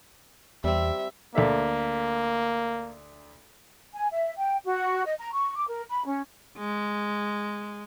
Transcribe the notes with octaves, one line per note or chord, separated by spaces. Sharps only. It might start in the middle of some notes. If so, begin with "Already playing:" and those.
E2 G3 C4 E5
D2 A#3 A4 E5
G#5
E5
G5
F#4
D#5
A#5
C#6
D6
A#4
B5
C#4
G#3